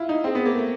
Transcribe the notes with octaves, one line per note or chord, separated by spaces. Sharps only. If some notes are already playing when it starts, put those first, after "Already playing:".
Already playing: E4 F4
D#4
C4 G#4
B3
A#3
A3